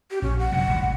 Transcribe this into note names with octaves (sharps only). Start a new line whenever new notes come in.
G4
A#1 C#4
F#5
F#1 C3 F#3
D#1 A1 G3